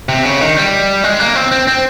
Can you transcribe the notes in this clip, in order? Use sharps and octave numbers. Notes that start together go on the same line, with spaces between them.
C3
C#3
D#3
G3
G#3
A#3
C4
C4
C4